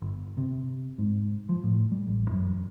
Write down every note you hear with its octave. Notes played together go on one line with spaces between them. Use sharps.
G1
C3
G#2
F3
A2
G3
A1
F#2